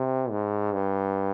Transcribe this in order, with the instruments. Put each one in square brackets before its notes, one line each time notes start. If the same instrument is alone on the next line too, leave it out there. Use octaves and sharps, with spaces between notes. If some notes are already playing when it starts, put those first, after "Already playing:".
Already playing: [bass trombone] C3
G#2
G2